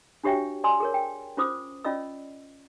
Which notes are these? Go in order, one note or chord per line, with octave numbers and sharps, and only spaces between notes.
D4 F#4 G4 C#5 E5 G5
D5 G#5 C6 E6
G#4 A#4 C#5
G5
C#4 F4 C5 D6 D#6
C#4 F4 D5 D#5 E6